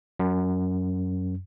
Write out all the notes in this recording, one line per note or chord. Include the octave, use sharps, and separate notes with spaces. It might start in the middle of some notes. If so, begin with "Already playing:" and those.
F#2